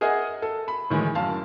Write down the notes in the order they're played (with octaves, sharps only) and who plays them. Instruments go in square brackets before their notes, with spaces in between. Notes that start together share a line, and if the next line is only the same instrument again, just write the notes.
[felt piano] G#4 A#4 D#5 E5 F#5 G#5
A4
B5
A2 D#3 E3 G#3
F#2 F5 A5